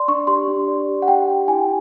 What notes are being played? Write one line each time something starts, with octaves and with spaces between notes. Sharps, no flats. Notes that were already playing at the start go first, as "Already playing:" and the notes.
Already playing: D5 C6
D4 C#6
G4 C6
D4
D5
G4
F#5
G4 G5
G4
E4 G#5